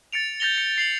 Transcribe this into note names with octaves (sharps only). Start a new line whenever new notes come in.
A6 C#7 D7 F7
G6 A6 A#6 F7 G7
C#7
C7 F7 F#7